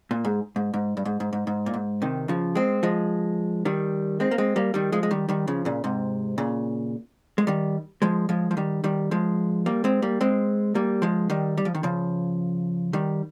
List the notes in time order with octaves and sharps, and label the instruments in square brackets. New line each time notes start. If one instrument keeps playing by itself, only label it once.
[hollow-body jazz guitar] A#2
G#2
G#2
G#2
G2
G#2
G#2
G#2
G#2
A#2
G#2
C3 D#3
C#3 F3
G#3 C4
F3 G#3
D#3 G3
G#3 C4
A#3
G#3 C4
G3 A#3
D#3 G3
F3 G#3
G#3
D#3 G3
D#3 G3
C#3 F3
A#2 C#3
G#2 C3
A#2 C#3
G#3
D#3 G3
F3 G#3
F3 G#3
F3
D#3 G3
D#3 G3
F3 G#3
G3 A#3
G#3 C4
G3 A#3
G#3 C4
G3 A#3
F3 G#3
D#3 G3
G3
F3
D#3
C#3 F3
D#3 G3